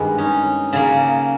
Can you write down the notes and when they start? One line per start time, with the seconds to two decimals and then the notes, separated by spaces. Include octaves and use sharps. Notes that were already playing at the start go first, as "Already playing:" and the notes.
Already playing: G2 D#3 G#3 B3
0.18 C#4 D#4
0.73 C#3 F#3 A#3